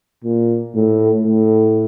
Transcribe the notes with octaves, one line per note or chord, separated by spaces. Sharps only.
A#2
A2
A2